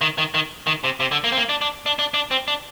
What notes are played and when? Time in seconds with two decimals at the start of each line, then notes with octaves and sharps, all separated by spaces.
0.01 D#3
0.18 D#3
0.34 D#3
0.67 D#3
0.84 C3
1.00 C3
1.12 D3
1.24 A#3
1.32 C4
1.37 A#3
1.49 D4
1.61 D4
1.86 D4
1.99 D4
2.14 D4
2.31 C4
2.48 D4